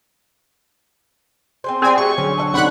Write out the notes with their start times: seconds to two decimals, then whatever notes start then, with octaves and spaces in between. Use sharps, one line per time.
1.64 C4 G#4 C5
1.82 G3 C4 F4 G#4 G#5
1.98 A3 F#4 G4 C#6
2.18 D3 F#3 C#4
2.38 A4 E5 F#5
2.54 C3 F#3 C4 D4 D#4 F#5 B5 F#6